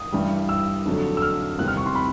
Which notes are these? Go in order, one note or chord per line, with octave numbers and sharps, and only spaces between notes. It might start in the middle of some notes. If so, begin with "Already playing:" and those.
Already playing: D#6
G2 E3 G3
E6
F2 D3 F#3 A3
E6
F6
E2 C3 D#3 G3 C4 F#6
F6
C#6
C6
B5